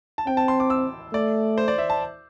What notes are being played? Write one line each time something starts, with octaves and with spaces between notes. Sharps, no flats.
A5
C4 G5
A5
C6
D6
E6
A3 D5
C5
D5
E5
A5